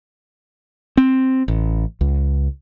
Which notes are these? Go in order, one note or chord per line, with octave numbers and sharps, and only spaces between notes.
C4
A1
C#2